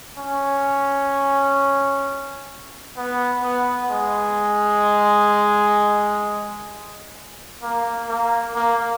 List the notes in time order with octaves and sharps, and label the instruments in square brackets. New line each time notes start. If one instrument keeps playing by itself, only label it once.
[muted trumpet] C#4
B3
B3
G#3
A#3
A#3
A#3